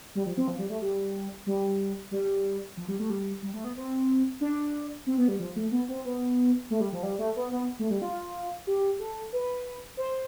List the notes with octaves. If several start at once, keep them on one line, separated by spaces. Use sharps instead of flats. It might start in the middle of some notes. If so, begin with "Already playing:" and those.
G3
F3
C4
F3
G3
A3
G3
G3
G3
F3
G3
A3
G3
G3
A3
B3
C4
D4
C4
B3
G3
F3
A3
B3
C4
B3
A3
G3
F3
G3
A3
B3
B3
A3
G3
F4
G4
A4
B4
C5